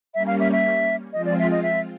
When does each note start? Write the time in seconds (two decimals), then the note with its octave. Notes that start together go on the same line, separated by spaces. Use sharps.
0.14 G3 A#3 C#4 E5
0.27 F5
0.40 E5
0.52 E5
1.13 F3 G#3 C4 F4 D#5
1.26 D5
1.39 E5
1.51 D#5
1.63 E5